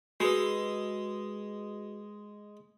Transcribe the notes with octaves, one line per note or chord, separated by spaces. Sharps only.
G#3 F#4 B4